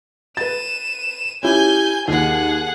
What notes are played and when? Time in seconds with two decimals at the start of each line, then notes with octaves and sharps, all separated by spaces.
0.37 B4 A6 D#7 E7
1.43 C#4 E4 G4 G#5 G6
2.08 D#2 G#4 F#5